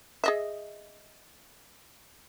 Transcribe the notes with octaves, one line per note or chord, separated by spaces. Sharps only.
G#4 D#5 E5